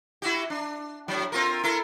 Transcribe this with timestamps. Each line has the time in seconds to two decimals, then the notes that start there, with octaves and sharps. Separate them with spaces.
0.22 E4 F#4 G4
0.50 D4
1.08 A2 F#3
1.32 C4 F4 A#4
1.64 E4 A4 A#4